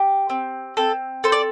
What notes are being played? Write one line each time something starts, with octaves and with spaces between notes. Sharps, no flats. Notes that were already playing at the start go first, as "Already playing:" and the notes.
Already playing: G4
C4
C4 A4
A4 C5
D5